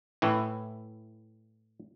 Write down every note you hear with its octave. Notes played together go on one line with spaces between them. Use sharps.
A2 E3